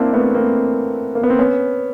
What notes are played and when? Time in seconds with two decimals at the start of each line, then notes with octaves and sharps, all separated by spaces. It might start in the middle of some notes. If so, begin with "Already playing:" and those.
Already playing: A#3 C4 D4 E4
0.13 A3 B3
0.34 A#3 C4
1.15 A#3
1.23 B3
1.30 C4
1.39 B3 C#4